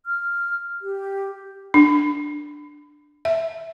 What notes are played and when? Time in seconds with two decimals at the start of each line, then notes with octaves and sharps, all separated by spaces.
0.06 F6
0.82 G4
1.74 D4
3.25 E5